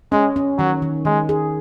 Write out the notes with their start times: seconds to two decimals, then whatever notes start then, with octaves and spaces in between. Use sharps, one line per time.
0.12 G#3 C#4
0.36 C#4
0.58 D#3 F#3
0.82 D#3
1.05 D#3 G#3
1.29 G#4